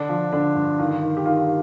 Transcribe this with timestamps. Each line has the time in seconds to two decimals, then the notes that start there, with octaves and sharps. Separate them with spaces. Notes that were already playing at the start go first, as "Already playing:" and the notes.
Already playing: D3 D4
0.09 F3
0.33 D3 D4
0.55 G2
0.79 D#3 F4
1.02 D#3
1.17 G4
1.26 D#3 F4